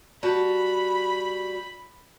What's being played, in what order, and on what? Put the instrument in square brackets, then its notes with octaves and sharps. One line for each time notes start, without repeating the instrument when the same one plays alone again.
[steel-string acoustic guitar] G3 F#4 A5 [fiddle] B5